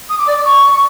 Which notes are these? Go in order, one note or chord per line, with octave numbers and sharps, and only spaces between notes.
D#6
D6
D5
D6
C#6